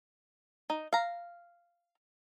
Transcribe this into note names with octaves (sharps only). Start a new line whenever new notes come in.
D#4
F5 A#5